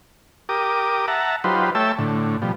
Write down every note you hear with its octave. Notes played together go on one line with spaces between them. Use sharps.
G4 A#4 D6 D#6
E5 F#5 A5 A#5
F#3 D#4 F4 G4 B4 C5
A3 C#5 E5 G5 A5 E6
A2 D3
B2 F3 G3